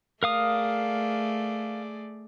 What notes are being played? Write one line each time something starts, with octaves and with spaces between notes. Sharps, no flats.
A3 G#4 A#4 D5 F5 D#6